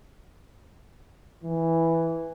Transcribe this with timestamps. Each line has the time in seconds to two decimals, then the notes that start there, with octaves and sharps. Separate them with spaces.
1.43 E3